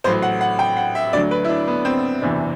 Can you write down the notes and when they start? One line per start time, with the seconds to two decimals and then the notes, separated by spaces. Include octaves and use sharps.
0.04 A1 A2 F#3 C5
0.22 F#5
0.41 F#5
0.59 G5
0.77 F#5
0.95 E5
1.13 D2 D3 F#3 D5
1.31 B4
1.44 E4
1.49 D4
1.68 B3
1.85 C4
2.22 F#1 E2 C3 E3 D4